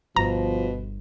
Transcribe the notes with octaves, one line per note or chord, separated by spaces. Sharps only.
G1 B2 F3 A#5